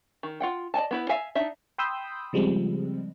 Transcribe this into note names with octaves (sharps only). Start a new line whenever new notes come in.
D#3
F4 F#5 G5
D5 D#5 G#5 A5
B3 E4 B4
E5 F5 G#5
D4 D#4 E5
G5 B5 C6 D#6 E6 G6
C#3 F3 G3 G#3 C4